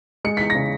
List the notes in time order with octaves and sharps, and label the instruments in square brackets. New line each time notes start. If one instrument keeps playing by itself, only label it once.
[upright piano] G#3 C#7
E2 B6
A#6
C#3